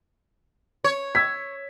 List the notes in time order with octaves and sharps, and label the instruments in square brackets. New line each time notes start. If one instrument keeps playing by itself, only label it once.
[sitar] C#5
[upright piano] E6 G#6 B6